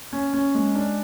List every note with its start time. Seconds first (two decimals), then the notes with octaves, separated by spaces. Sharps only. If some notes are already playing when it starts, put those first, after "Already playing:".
0.13 C#4
0.34 C#4
0.55 G#3
0.75 D4